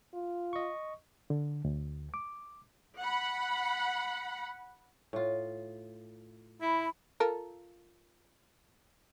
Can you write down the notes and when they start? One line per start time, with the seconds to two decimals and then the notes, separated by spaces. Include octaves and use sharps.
0.14 F4
0.53 D#5 C#6
1.30 D3
1.65 D2
2.14 D6
2.98 F#5 B5
5.13 A2 F4
6.61 E4 B5
7.20 F4 A4 A#4